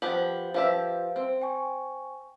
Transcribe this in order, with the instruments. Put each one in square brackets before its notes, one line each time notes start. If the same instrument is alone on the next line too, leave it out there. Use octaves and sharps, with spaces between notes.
[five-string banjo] F3 B3 G4 [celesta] F#7
[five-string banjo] F3 G4 E5 [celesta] B4 F5
[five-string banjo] C4
[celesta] G5 G#5 C#6